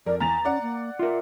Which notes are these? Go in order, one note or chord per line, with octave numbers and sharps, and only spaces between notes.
F2 A#4 D5
E2 G#5 A#5 A6 F7
C#4 D5 F#5
A#3
F4 A#4 E5